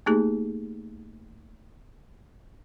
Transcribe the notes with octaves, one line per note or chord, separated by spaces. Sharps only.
A3 A#3 D#4 G4 G#4